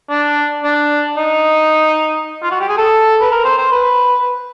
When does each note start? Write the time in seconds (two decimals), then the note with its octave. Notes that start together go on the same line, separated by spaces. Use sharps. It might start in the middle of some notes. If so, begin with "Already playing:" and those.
0.10 D4
0.64 D4
1.17 D#4
2.43 F4
2.51 F#4
2.60 G4
2.68 G#4
2.78 A4
3.21 B4
3.31 A#4
3.44 C5
3.58 C5
3.72 B4